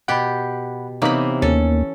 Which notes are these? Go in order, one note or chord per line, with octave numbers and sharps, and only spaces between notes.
B2 G4 F#5 G5 B5
C3 E3 A#3 B3 D#4 C#5 B5
D#2 A#3 C#4 A4